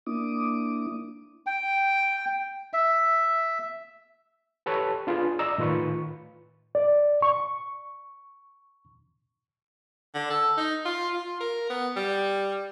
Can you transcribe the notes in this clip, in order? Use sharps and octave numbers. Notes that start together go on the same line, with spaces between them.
A#3 D4 E4 D6 D#6
G5
E5
G4 A4 B4 C#5
D4 F4 G#4 B4
D5 D#5 A#5 E6
A2 D#3 F4 B4 C#6
D5
C#6
D3
A4
D#4
F4
F4
A#4
B3
G3